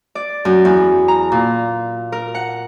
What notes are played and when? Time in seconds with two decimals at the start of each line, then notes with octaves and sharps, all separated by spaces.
0.15 D5
0.45 F#2
0.65 E2
1.08 A#5
1.32 A#2
2.12 A#4
2.35 F#5